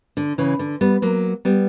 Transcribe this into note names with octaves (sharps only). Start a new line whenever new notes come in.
D3
C#3 E3
D3
G3 B3
F#3 A#3
G3 B3